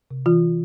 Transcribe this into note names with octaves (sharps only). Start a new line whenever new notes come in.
C3
E3 F4